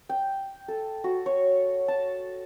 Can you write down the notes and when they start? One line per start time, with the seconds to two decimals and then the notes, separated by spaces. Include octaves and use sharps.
0.09 G5
0.68 A4
1.04 F#4
1.26 C#5
1.88 A5